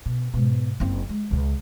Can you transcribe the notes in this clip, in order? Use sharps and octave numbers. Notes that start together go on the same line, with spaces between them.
B2
G#2 B2
F#1 C4
G#3
C#2 C#3